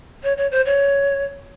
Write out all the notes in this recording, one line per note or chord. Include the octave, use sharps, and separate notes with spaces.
C#5
C#5
C5
C#5